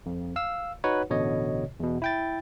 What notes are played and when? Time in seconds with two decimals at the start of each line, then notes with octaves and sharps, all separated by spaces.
0.06 F2
0.36 F5 E6
0.84 D#4 F#4 B4 C#5 F#5
1.10 A1 B2 D3 C#5 D#5
1.80 E2 B2
2.02 E4 G5 A6